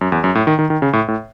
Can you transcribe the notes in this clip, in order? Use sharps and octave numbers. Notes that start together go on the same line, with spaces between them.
F#2
E2
F#2
A2
D#3
D#3
D#3
C#3
A2
A2